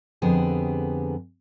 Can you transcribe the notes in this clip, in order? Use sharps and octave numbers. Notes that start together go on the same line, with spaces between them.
F2 D3 B3 G4 G#4